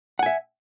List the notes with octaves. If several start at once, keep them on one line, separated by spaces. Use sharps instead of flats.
E5 F#5 G#5